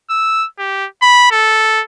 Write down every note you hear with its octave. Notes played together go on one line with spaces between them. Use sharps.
E6
G4
B5
A4